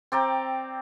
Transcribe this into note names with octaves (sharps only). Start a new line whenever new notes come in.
C4 D5 G5 A#5